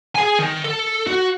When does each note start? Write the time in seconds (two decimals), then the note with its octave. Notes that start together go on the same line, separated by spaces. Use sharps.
0.16 G#4 G#5
0.39 D#3
0.64 A4
1.07 F#4